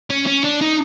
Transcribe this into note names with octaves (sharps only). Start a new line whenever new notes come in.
C#4
C#4
D4
D#4